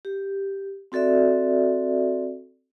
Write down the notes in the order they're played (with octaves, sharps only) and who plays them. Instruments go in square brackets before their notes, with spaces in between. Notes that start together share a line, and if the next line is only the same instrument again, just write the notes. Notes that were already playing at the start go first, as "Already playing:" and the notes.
[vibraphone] G4
C4 F#4 A4 D5 E5